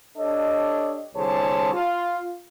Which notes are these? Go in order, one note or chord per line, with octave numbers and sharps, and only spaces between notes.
D4 G4 A4 C#5 D#5
C2 D3 G#4 C5 C#5 A5
F4